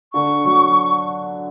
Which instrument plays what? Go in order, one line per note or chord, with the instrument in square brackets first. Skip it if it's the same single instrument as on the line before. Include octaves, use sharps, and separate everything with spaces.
[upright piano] D3 [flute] C#6
[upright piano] F#3